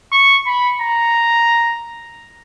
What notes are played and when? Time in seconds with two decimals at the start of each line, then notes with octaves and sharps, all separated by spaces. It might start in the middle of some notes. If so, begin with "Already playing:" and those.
0.12 C#6
0.46 B5
0.81 A#5